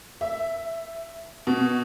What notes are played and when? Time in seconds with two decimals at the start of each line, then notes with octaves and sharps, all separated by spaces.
0.21 E5
1.47 B2